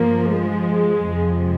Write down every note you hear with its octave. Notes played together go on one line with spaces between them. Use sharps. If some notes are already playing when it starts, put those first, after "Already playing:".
Already playing: G2 F3 A#3
G#3
F2 C3 F3